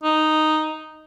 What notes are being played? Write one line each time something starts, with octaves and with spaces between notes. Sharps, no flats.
D#4